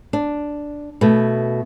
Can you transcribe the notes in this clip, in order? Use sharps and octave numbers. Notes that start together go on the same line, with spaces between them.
D4
B2 A3